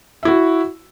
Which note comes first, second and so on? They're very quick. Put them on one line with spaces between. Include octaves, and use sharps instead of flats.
E5 E4 F#4